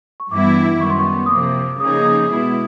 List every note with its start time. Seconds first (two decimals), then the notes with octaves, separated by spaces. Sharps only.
0.20 C#6
0.31 G2 E3 G3 B3 E4 D6
0.81 F#2 D#3 G3 B3 C#6
0.90 C6
0.99 C#6
1.26 D#6
1.30 C3 F3 A#3 D6
1.80 C#3 F3 A#3 D#4 G#4 D#6
2.02 D#6
2.30 B2 G#3 B3 E4